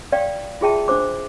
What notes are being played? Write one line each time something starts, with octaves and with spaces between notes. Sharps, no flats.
D5 F5 G5
F4 F#4 G#4 E5 G5 A5
D4 F#4 C5 D6